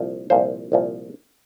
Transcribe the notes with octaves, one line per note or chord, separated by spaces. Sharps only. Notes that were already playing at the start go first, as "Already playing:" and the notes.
Already playing: C2 A#2 F3
C2 A#2 F3 C5
C2 A#2 F3